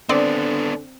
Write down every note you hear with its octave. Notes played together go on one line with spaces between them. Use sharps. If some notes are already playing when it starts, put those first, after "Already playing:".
D3 B3 C4 D4 D5